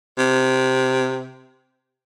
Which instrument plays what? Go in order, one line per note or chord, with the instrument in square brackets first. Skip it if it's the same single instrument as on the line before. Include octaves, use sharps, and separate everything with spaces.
[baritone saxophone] C3